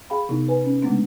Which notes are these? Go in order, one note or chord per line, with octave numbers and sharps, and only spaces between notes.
G#4 F5 G5 B5
C3 B3 D#4
B4 G#5
C#4
C#3 G#3 A3 B3 D4